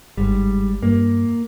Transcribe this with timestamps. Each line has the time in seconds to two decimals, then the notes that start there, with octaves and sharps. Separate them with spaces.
0.18 G1 G#2 G3
0.83 G2 A#3